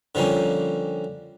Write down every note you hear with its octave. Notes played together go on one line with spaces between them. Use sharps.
D3 F3 G3 A#3 C#4